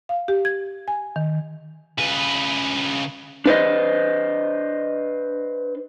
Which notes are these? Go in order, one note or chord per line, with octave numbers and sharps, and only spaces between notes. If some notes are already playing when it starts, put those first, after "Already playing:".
F5
G4
G#6
G#5
D#3
C#3 B4
D4 B4 C5 D#5